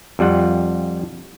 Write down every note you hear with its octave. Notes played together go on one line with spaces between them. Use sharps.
F2 G3 F4 F#5